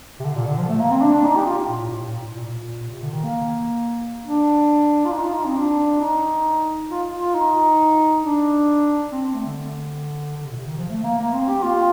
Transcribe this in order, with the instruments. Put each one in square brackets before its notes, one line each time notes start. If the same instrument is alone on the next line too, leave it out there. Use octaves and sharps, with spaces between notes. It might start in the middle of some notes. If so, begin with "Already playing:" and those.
[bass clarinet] C3
D3
A#2
D3
F3
A3
A#3
C4
D4
D4
D#4
G4
F4
A#2
A2
A2
A2
A#2
A#2
A#2
C3
D3
D#3
A#3
D4
F4
D#4
F4
D#4
C4
D4
D#4
F4
F4
D#4
D4
C4
C4
A3
D3
D3
C3
A#2
C3
D#3
F3
A3
A#3
A#3
C4
G4
F4